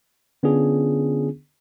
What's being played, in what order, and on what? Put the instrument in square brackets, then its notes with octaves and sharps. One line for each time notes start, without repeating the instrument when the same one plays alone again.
[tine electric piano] D3 B3 C#4 D4 F4 G#4